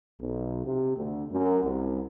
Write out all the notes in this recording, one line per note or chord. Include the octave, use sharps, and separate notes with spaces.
B1
C3
D2
F#2
C2